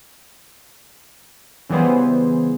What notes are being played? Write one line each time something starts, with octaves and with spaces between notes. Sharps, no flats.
C#3 E3 G3 B3 G#4 C5